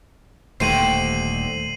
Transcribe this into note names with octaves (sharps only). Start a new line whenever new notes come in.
D#1 D#2 D3 A3 C4 C7 D#7 F#7